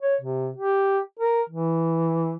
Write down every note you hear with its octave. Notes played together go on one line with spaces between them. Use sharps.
C#5
C3
G4
A#4
E3